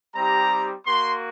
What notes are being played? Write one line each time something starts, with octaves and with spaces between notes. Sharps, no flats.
G3 C4 D#4 G4 A#5
A#3 F#4 C6